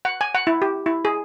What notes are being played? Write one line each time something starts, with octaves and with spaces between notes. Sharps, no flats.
F#5
G#5
F#5
E4
G4
E4
G#4